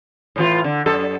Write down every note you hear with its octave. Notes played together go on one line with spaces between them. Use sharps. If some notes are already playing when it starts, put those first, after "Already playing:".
A2 E3 F4
D3
F#2 A4